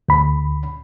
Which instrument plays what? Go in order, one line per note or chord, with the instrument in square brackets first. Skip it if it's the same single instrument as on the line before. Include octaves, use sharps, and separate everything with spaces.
[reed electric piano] D2 B5